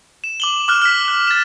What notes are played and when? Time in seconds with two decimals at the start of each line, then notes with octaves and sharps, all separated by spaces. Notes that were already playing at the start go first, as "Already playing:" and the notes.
0.24 E7
0.40 D6 F#7 G7
0.68 D6 F6 F#6
0.82 F6 B6
1.08 F#6
1.27 A6 E7